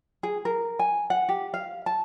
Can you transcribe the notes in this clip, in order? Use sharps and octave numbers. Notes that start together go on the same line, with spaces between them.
G#4
A#4
G#5
F#5
G4
F5
A5